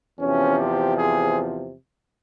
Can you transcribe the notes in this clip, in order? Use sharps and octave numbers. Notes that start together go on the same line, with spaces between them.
E2 C3 F3 C#4
G4
G#4